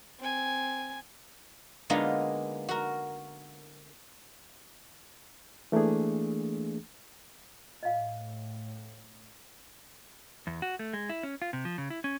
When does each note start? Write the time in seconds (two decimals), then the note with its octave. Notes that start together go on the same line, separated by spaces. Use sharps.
0.19 C4 G#5
1.90 D3 G#3 A#3 B3 D#4 F4
2.69 F#4 A#4
5.72 E3 A3 A#3 D4 G#4
7.83 A2 D#5 F5
10.47 E2
10.62 F#4
10.79 A3
10.93 G#3
11.09 E4
11.23 C#4
11.42 F4
11.53 C3
11.65 F3
11.78 C#3
11.90 E4
12.04 C#4